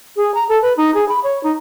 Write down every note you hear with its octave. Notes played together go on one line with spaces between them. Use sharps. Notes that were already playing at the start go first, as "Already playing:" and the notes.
G#4
A#5
A4
B4
D#4
G#4
B5
C#5
D#4